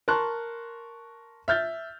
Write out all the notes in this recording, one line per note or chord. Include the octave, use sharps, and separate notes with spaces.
A#4 A5 C6 C#6 F#6
E5 F6 G6 A6